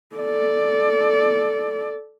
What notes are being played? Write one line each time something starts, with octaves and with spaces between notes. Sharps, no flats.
A4 D5